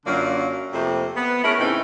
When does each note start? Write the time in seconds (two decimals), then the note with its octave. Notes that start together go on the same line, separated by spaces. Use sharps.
0.06 F#2 D3 F#3 A#3 F4 D5
0.73 F2 C3 F3 A3 A#3 C5
1.16 B3
1.43 G#3 A3 C#4 E4 A#4
1.59 A2 C#3 E3 A3 C4 D#4